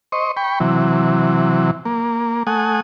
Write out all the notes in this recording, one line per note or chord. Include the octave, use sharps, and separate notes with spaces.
C5 D#5 C#6
G5 B5 C#6
C3 E3 F#3
A#3
A3 F#5 G#5 D#6